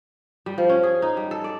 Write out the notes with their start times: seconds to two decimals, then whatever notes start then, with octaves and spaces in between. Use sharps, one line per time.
0.46 G3
0.58 F3
0.69 C#4
0.83 G#4
1.02 D#4
1.17 G3
1.31 A4
1.44 D5